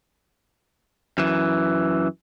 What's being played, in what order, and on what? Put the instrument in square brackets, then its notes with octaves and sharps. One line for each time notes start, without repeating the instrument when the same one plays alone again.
[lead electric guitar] F#2 E3